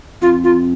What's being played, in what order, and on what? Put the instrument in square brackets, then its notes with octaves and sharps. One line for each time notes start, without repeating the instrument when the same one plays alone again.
[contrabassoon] F2 [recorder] F4
[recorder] F4